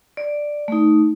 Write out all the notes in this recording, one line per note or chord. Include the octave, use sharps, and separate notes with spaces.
D5
A3 D#4